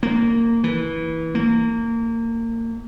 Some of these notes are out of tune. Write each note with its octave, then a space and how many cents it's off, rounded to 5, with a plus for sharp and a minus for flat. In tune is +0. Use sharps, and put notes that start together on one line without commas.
A#3 -15
E3 -20
A#3 -25